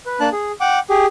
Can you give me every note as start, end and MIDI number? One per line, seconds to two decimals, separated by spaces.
0.06 0.20 71
0.20 0.29 58
0.20 0.29 62
0.20 0.29 81
0.20 0.29 90
0.32 0.52 68
0.61 0.79 78
0.61 0.79 79
0.61 0.79 86
0.90 1.06 67
0.90 1.06 68